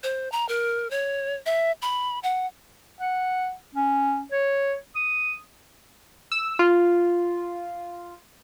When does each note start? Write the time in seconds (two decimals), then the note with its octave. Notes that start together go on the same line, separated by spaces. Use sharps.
0.03 C5
0.32 A#5
0.49 A#4
0.91 C#5
1.46 E5
1.82 B5
2.23 F#5
3.00 F#5
3.75 C#4
4.32 C#5
4.96 D#6
6.32 E6
6.59 F4